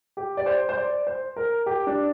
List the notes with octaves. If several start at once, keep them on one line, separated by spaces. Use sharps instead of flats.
G4
D5
C5
C5
D5
C5
A#4
G4
D4